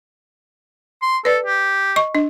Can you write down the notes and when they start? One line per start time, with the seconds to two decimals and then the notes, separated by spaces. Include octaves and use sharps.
1.02 C6
1.25 A4 B4 D5
1.46 G4
1.96 D#5 C#6
2.15 D4 D#5